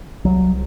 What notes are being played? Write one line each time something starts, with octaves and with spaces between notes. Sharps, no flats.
C2 F#3